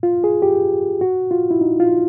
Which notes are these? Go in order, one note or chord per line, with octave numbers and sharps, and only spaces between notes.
F4
G#4
G4
F#4
F4
E4
D#4
F4